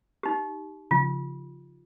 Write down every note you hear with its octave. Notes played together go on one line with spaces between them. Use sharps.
D#4 G4
C#3 F3 F4